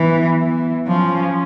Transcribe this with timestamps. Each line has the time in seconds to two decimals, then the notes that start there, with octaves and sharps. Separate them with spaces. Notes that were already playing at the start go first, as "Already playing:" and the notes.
Already playing: E3 B3
0.41 E3
0.87 F3 C#4